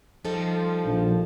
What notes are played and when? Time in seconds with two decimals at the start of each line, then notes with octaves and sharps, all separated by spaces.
0.25 F3 G3 D#4 A4
0.86 A#1